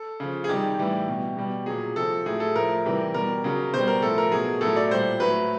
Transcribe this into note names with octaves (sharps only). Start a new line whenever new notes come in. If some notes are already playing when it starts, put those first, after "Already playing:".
Already playing: A4
C#3 F3
G#4
C3 D#3 G3 G4
A2 E3 G3
B2 G3
B2 G3
A#2 F#3 G#4
C3 F3 A4
A2 F#3 G#4
A4
A2 F3 A#4
C3 E3 G3
B2 G3 A#4
C#3 F#3
B2 G3 C5
A#4
A2 F3 A4
A#4
B2 F#3 G#4
A2 A4
F#3
D5
A#2 G3 C5
A2 F#3 B4